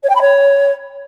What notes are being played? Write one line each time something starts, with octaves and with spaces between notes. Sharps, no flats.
C#5
G5
B5
C#5